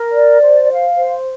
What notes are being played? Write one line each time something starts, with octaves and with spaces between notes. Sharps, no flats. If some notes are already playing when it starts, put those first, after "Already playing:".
Already playing: A#4
D5
C5
F5
C5